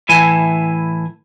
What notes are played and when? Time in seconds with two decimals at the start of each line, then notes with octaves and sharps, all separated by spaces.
0.09 A2 E3 E4 G#5